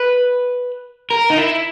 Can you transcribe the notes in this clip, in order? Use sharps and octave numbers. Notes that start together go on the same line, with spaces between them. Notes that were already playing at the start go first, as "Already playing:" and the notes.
Already playing: B4
A#4
D#4
E4